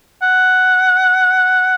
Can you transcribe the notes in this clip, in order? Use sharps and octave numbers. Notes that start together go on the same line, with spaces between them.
F#5